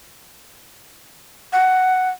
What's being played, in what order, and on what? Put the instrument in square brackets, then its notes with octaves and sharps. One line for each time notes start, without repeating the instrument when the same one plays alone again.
[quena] F#5